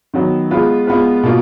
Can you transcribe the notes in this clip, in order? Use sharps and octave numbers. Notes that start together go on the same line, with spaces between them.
D#3 F#3 B3
G#3 B3 F4 B4
G#3 B3 F4 B4
B2 A#3 F4